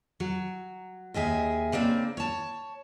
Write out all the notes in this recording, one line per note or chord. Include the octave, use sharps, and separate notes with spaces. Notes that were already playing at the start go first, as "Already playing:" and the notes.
F#3
D#2 D#3 G#4 E5
C#3 A#3 C4 D4
C#5 A5